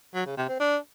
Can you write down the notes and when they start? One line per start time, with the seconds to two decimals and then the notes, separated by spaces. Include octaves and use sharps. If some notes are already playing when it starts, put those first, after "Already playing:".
0.14 F#3
0.25 C#3
0.37 C3
0.48 C4
0.60 D4